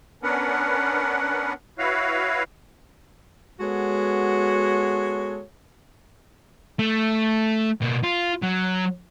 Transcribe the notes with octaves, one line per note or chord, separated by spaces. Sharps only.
B3 C#4 D4 A#4 B4 F#5
E4 F#4 B4 C#5 F5
G#3 B3 F#4 A4 C#5
A3
B2 A#3
F4
F#3